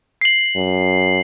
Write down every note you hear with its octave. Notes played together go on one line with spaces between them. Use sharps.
C7 F#7
F#2